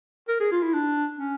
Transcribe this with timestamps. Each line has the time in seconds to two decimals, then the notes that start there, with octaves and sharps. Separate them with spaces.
0.28 A#4
0.40 G#4
0.51 F4
0.62 E4
0.74 D4
1.19 C#4